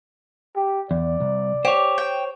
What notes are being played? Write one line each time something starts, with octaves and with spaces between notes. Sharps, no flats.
G4
E2 D5
C2
G4 C5 C#5
G5